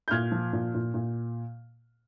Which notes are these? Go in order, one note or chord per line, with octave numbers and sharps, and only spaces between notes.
G6
A#2 F6 G#6
F3
A#2
A#2
A#2